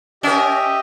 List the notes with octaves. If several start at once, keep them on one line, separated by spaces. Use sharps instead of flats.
C#4 G4 A#4 D#5 E5